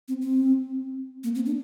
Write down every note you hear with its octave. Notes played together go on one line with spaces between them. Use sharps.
C4
C4
A#3
C4
D4